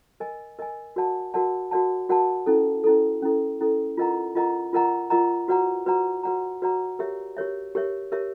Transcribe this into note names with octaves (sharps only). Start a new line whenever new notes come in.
A#4 D#5 G#5
A#4 D#5 G#5
F#4 A#4 D5 F#5 A5
F#4 A#4 D5 F#5 A5
F#4 A#4 D5 F#5 A5
F#4 A#4 D5 F#5 A5
C#4 E4 A4
C#4 E4 A4
C#4 E4 A4
C#4 E4 A4
F4 A#4 D#5 F#5 A#5
F4 A#4 D#5 F#5 A#5
F4 A#4 D#5 F#5 A#5
F4 A#4 D#5 F#5 A#5
F#4 B4 D5 F#5 A#5
F#4 B4 D5 F#5 A#5
F#4 B4 D5 F#5 A#5
F#4 B4 D5 F#5 A#5
G4 A#4 C#5 E5
G4 A#4 C#5 E5
G4 A#4 C#5 E5
G4 A#4 C#5 E5